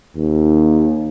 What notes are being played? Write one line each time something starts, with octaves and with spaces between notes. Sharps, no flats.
D#2